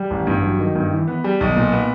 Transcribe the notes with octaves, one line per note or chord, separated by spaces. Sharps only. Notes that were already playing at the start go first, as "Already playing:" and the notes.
Already playing: G3
A1
G2
F#3
D#3
G2
E3
B3
G3
B1
A#2
B3